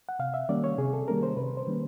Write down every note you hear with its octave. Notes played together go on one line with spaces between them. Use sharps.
F#5
C3 F5
E5
D#3 G3 A#3 C#4 D5
C#5
C3 G#4
A4
D#3 G3 A#3 C#4 A#4
C5
C3 B4
C5
D#3 G3 A#3 C#4